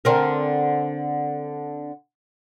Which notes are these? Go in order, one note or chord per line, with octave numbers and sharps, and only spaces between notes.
D3 C4 A#4